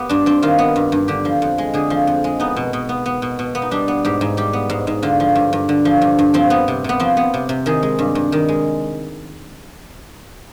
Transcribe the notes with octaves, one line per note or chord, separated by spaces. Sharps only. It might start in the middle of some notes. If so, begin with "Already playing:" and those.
Already playing: B3 G4
G2 D4
G2 C4
D#3 F4
B3
G2
G2
D3 G4
F3
F2
G#3
D3 G#4
F3
F2
G#3
B3 D#4
B2
B2
B3
B3
B2
B2
B3
D#4
G3 D4
B3
G#2 G4
G#2
G3 G4
B3
G#2
G#2
D3 F4
F3
G2
G2
D3
F3
G2
G2
F3 C4
B3
C3
C3 B3
F3 C4
B3
C3
C3
D#3 G#4
G#3
G2
G2
D#3
G#3